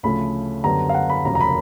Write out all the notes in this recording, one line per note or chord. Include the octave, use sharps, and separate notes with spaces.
D2 C#3 F3 A3 B5
F#2 D3 G3 B3 A#5
F5
F#5
B5
F1 D#2 C#3 F#3 A#3 A#5
A#5
B5